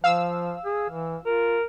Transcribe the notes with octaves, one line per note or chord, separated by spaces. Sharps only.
F3 F5 E6
G#4
E3
F4 A#4